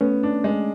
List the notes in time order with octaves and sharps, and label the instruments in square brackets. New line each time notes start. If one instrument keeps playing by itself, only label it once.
[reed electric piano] A3 C#4 [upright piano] B3
[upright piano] D4
G#3